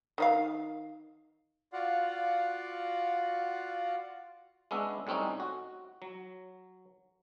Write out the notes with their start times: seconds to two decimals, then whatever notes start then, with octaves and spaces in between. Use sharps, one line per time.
0.18 D#3 D#4 F5
1.73 F4 F#4 D5 F5 F#5
4.71 G#3 B3 C#4 D4 E5
5.07 A2 G3 C4 C#4 D#4
5.40 F#4
6.02 F#3